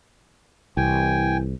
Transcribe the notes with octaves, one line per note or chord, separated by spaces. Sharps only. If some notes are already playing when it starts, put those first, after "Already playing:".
C2 E3 G5 G#5